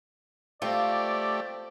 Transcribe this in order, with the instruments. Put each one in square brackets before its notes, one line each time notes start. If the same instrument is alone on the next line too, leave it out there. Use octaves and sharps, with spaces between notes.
[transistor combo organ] A3 G4 [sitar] C4 [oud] F4 [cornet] D5